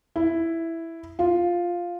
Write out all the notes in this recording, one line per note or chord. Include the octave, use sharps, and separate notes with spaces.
E4
F4